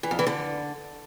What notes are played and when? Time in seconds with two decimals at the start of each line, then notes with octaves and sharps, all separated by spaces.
0.03 E3
0.11 F2
0.19 E3
0.27 D3